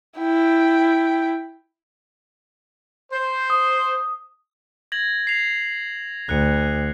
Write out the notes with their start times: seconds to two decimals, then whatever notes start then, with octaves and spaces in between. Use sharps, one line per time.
0.19 E4 G5
3.13 C5
3.50 D#6
4.92 G#6 A#6 F#7
5.27 C7 F7
6.29 D2 F#6 C#7